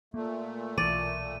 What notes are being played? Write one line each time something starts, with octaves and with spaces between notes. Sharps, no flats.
A#2 A3 A#3
B1 E3 D5 D#7